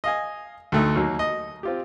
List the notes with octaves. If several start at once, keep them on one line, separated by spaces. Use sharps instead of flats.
D#5 F5 G#5
D2 A3 D#4
D#2 F#3 A#3
D#5
C4 F4 G4